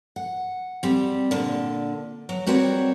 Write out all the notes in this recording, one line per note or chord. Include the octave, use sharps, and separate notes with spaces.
F#5
G3 C4
A#2 D3
F#3
G3 C4 F#4 A#4 C5 C#5